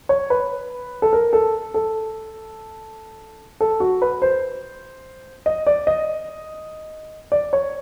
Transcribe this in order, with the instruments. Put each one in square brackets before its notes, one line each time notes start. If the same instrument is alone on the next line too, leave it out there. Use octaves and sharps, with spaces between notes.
[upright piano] C#5
B4
A4
A#4
A4
A4
A4
F#4
B4
C5
D#5
D5
D#5
D5
C#5